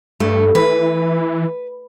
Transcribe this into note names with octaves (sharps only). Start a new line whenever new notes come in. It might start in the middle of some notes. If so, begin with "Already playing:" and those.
G2 A3
E3 B4